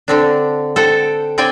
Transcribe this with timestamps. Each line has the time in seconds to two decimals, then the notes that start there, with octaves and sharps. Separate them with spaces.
0.08 D3 C4 D4
0.76 A4 C5 F#5 G5
1.38 C4 D5 G5 G#5